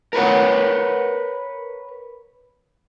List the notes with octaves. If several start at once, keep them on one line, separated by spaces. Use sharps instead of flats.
A#4 B4 C#5 F#5